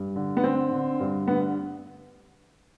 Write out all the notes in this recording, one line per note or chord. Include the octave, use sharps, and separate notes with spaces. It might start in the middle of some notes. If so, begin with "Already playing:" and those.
Already playing: G2
D3
B3
D3 C4
D3
G2
D3 B3